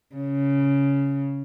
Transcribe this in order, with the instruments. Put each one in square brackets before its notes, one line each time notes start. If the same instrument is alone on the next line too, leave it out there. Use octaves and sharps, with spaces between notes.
[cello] C#3